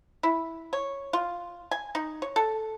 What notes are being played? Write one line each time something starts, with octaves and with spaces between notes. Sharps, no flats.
E4
C#5
F4
G#5
D#4
C#5
A4